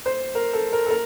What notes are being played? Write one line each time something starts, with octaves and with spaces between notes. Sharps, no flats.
C5
A#4
A4
A#4
A4
A#4